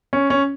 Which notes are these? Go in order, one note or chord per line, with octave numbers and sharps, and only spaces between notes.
C#4
C#4